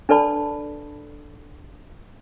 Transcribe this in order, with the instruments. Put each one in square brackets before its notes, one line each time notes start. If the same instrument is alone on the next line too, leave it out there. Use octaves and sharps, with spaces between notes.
[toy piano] D4 A4 B4 D5 A5 B5